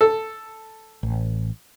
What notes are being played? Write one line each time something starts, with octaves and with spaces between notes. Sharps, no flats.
A4
A1